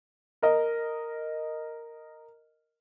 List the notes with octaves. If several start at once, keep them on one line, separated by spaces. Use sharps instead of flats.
A#4 D#5